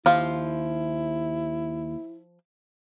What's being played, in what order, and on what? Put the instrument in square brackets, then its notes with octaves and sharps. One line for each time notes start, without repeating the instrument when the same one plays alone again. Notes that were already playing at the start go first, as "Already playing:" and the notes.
[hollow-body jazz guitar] D#2 [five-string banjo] F3 F4 [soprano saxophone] E4